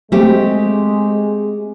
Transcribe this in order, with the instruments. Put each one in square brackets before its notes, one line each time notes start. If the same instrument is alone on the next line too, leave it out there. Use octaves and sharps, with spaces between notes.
[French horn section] G#3 [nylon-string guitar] A3 C4 G4